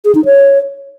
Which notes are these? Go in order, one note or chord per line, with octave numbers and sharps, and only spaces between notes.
G#4
D#4
C#5